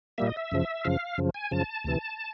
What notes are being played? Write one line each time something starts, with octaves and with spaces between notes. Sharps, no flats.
A#2 G3 A#3 E5
D#5
E5
F#2 C#3 F3
F#2 C#3 F3 F5
F#2 C#3 F3
G#5
F#2 C#3 F3 A5
D2 C3 E3